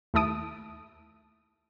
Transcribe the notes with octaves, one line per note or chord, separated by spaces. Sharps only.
D#2 A3 E4 A5 D#6 D7